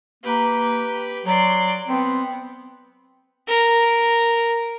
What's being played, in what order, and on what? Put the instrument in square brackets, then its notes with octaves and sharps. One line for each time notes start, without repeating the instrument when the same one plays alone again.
[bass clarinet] A#3 [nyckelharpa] G4 B4
[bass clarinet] F#3 [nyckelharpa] D5 C6
[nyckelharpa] B3 [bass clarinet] C4
[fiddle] A#4